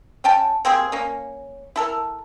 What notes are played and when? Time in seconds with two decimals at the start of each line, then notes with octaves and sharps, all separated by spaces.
0.24 C#4 G5 A5
0.65 A#3 C4 G4 G#4
0.92 A#3 C#4
1.76 E4 A4 A#4